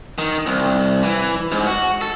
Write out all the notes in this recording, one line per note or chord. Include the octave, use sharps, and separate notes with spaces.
D#3
C2
E3
G#2
F#4
A4